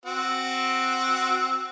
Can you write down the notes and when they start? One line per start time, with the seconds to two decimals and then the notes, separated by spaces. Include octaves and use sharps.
0.06 C4 F#4